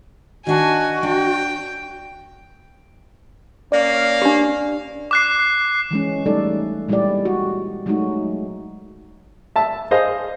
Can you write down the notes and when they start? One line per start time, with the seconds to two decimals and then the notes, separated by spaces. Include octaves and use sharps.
0.47 D#3 D4 F#4 G#5 A5
1.03 D4 G5
3.72 A#3 C#4 D5 F5
4.22 D4 G4
5.11 D6 F#6 C7
5.91 E3 G#3 C#4
6.26 G3 A3 D#4 A4 D5
6.89 A#2 G3 G#3 E4 G4 D5
7.25 F#4
7.86 F#3 G#3 A3 D#4 F#4
9.56 E5 A5
9.91 G#4 C5 D#5 F5